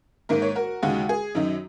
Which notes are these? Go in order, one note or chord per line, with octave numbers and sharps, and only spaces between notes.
G#2 D#3 A#3 A#4
C#5
F#4 A#4
D#2 C#3 G#3 D#4 F#4
G#4
F#2 D#3 F#3 D#4